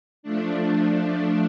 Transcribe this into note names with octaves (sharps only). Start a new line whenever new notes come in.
F3 A3 D4